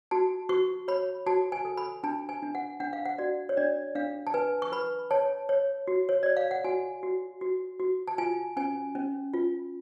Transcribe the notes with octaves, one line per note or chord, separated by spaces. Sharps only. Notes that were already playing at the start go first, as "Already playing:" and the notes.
F#4 A5
F#4 C#6
C#5 B5
F#4 A5
G#5
A4
B5
D4 A5
G#5
D4
F#5
D4 F#5
F5
F#5
F#4 D5
C#5
D4 D5
D4 F5
A5
B4 G#5
C#6
B4 B5
C#5 A5
C#5
F#4
C#5
C#5 D5
F5
F#5
F#4 G#5
F#4
F#4
F#4
A5
F4 G#5
C#4 G#5
C#4
F4